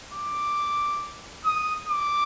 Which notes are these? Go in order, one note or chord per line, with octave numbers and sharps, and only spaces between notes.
D6
D#6
D6